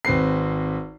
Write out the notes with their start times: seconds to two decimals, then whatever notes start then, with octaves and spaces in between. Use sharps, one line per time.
0.05 G#1 C4 B4 C7